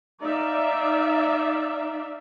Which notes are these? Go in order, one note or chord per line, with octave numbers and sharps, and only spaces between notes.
D#4 D5 E5 F5